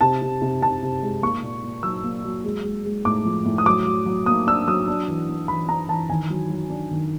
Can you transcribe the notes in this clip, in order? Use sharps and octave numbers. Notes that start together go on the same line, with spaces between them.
C3 A5
C3
C3
C3 A5
C3
G#3
A#3 C#6
A#2
A#2
F#3 E6
A#3
F#3
G#3
G#3
G#3
A2 D6
F3
A2
D#6
F#3 D6
F#3
F#3
A#3 D#6
D4 E6
F#3 D#6
D4
E3
D4
E3 B5
D4 A#5
E3 A5
D#3 G#5
F#3
F#3
D4
D#3